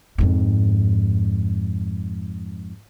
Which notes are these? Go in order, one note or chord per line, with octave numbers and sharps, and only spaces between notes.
F2 G#2